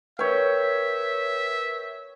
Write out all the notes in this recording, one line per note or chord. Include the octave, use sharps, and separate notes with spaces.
A#4 B4 C#5 E5 G5